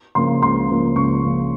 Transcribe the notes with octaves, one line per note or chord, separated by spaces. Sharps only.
C#3 F3 A#3 C6
C#2 C6
C#3 F3 A#3
C#2 C#6
C#3 F3 A#3